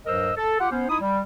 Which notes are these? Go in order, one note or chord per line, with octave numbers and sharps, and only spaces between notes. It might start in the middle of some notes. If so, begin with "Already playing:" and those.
G2 F#3 A#4 C5 D#5 E6
A4
F4 G4 F#5
B3 C#4 C5
D#4 E4 D#6
G3